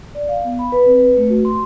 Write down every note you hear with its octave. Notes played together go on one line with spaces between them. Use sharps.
D5
F5
B3
B5
B4
C4
B4
A3
F#4
C6